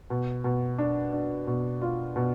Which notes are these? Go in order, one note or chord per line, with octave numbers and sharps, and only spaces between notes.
B2
B2
D4
D4
B2
F4
B2